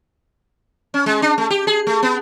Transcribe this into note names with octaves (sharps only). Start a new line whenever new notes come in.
C#4
G#3
D4
A3
G4
G#4
A3
B3